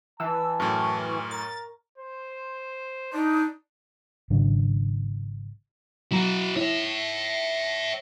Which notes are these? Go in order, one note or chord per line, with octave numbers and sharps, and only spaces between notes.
E3 A5 E6
F#2 A2 C#6 F6
A#4 A6
C5
D4 D#4
G#1 C#3 F#3 D4
B2 F#3 E4 F#4 A#5
E4 C#5 E5